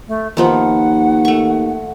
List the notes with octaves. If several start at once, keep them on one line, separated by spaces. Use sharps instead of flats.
A3
D#2 D#3 F3 B3 F#5
A3 C#6